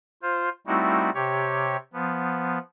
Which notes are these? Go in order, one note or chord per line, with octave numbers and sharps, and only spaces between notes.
F4 C5
G3 A3 C4 D#4 E4 F#4
C3 G4 C#5
F3 B3